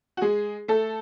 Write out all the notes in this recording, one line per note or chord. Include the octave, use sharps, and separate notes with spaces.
F#4
G#3 G#4
A3 A4